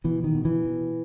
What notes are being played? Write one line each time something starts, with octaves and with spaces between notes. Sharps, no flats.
B2 E3
D#3
B2
E3
B2